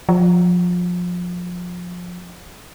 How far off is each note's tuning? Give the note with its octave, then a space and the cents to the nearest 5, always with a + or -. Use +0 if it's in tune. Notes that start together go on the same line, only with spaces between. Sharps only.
F3 +25